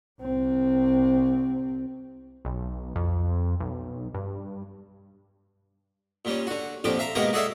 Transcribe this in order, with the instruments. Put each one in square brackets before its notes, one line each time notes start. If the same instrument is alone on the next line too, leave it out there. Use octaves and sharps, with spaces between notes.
[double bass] C2 C4
[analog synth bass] B1
F2
B1
G2
[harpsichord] A#2 G3 C#4
D3 F#4
A#1 F2 D3 F3 G4 D6
E5 F5 A#5
B2 G#3 A#3 B3 G4 A#4
F#4 G#4 A4 D5 E5 F5